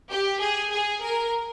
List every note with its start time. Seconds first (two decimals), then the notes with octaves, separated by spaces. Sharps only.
0.10 G4
0.41 G#4
0.72 G#4
1.02 A#4